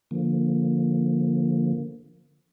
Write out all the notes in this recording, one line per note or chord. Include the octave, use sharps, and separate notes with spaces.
D3 F3 A#3